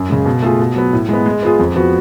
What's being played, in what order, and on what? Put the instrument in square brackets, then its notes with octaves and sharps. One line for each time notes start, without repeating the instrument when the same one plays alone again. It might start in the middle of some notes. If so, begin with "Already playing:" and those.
Already playing: [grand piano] F#2
C#3 G#3
B2
A3 F4 G#4
B2
F#3 B3
A2
G#3 B3
G#3
B3 F4 G#4
F2
F3 B3 F#4